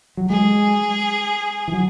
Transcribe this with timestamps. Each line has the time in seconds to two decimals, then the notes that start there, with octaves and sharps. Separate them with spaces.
0.17 F#3
0.30 G#3 G#4
1.68 E3
1.73 F#3